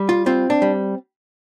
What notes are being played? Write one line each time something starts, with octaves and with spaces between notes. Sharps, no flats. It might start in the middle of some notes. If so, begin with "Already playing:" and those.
Already playing: G3
F4
C4 F4
D4
G3